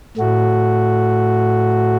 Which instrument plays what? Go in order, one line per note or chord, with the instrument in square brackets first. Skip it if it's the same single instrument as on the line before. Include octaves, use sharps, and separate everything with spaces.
[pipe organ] A2 A3 F#4